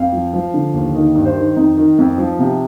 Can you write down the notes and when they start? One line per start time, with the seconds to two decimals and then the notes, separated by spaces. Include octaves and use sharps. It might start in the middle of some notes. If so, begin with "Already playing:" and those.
Already playing: F2 F5
0.12 F3
0.33 F3
0.54 D3
0.74 D#2
0.95 D#3 D#5
1.15 G2
1.25 C5
1.36 D#3
1.56 F2 D#4
1.77 D#3
1.98 F2
2.18 F3
2.39 C3